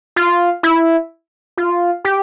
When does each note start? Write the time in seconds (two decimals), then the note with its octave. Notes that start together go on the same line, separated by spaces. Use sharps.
0.16 F4
0.63 E4
1.57 F4
2.05 G4